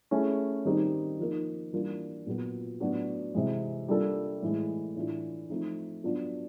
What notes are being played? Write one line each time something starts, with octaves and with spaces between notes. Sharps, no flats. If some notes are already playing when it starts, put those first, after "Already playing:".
A3 C#4 E4 G#4
D#3 G3 C4 D#4 G4
F3 A#3 D#4
E3 G3 A#3 D4 F4
A#2 F#3 B3
A2 F#3 B3 D4 F#4
C3 E3 G#3
G3 A#3 D4 F4 A4
A2 E3 G#3
A2 E3 A3 D4 F4
F3 A3 C4 D#4
F#3 B3 D4 F4